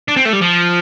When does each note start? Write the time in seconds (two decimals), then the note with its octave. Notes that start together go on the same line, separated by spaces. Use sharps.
0.08 D4
0.16 C4
0.25 A3
0.33 G3
0.41 F3